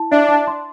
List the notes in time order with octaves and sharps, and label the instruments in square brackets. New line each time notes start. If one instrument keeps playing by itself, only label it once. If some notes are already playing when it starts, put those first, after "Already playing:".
Already playing: [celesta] E4 A5
[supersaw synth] D4 [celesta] E5
[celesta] A5
C6